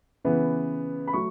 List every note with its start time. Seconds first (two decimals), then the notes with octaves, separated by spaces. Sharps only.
0.24 C#3 E3 B3
1.07 B5
1.13 F#3 A3 C#6